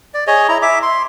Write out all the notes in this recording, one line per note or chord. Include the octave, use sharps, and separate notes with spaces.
D5
G#4 C#5 D#5
E4 A#5
E5 D6
C6